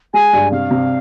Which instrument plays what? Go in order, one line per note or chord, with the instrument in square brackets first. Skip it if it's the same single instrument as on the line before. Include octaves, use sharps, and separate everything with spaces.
[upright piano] G#3 [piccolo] G#5
[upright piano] G2
[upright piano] C3 [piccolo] F5
[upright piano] C3